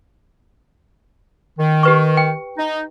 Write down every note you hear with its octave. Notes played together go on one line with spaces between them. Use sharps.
D#3
G4 B4 C#6
G5
D#4